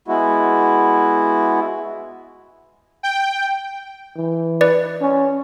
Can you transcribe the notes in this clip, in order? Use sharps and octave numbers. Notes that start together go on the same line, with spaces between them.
G#3 B3 E4 F#4
G5
E3
B4 D5
C#4